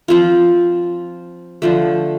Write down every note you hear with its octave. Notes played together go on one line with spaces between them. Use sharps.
F3 C4 F4
D3 F3 A3